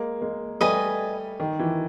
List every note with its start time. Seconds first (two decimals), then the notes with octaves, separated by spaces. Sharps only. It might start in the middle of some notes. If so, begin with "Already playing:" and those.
Already playing: G#3 A#3
0.22 G#3 A#3
0.61 G3 A3 B4 D#5 G#5
1.40 D#3
1.59 E3